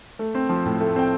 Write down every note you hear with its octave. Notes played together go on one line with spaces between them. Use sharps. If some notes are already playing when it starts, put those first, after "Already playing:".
A3
C4
F3
A2
A3
C4 G5